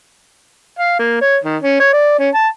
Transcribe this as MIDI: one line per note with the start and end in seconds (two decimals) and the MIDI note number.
0.79 0.99 77
0.99 1.20 58
1.21 1.37 73
1.44 1.57 51
1.62 1.77 61
1.80 1.92 73
1.93 2.15 74
2.19 2.29 61
2.35 2.47 81